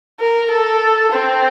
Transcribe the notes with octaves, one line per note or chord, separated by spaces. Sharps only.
A#4
A4
C4